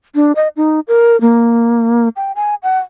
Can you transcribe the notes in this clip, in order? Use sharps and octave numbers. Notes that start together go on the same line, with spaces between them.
D4
D#5
D#4
A#4
A#3
G5
G#5
F#5